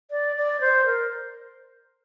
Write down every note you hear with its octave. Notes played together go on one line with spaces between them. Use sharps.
D5
D5
C5
A#4